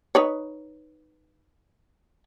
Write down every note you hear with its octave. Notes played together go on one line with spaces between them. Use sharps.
D#4 B4 C#5